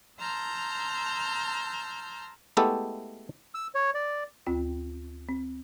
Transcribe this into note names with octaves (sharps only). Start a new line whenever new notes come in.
A5 A#5 C6 E6 F6 G6
G#3 A3 B3 E4 G4 A4
E6
C#5
D5
D2 C4 F4 G5
C4